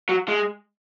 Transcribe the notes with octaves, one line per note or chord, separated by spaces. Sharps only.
F#3
G#3